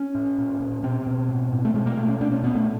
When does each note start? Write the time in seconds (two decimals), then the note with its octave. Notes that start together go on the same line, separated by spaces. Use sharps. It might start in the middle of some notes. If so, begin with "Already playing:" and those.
Already playing: C#4
0.15 A2
0.38 A#2
0.60 A#2
0.83 B2 C4
1.07 B2
1.28 A2
1.52 A2
1.65 A3
1.74 B2 G#3
1.86 A#3
1.97 B2 A3
2.08 C#4
2.20 A#2 D4
2.32 C#4
2.44 A#2 B3
2.55 A3